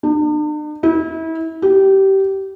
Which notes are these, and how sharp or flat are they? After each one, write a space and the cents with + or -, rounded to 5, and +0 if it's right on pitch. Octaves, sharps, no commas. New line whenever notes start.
D4 +45
E4 -30
G4 -20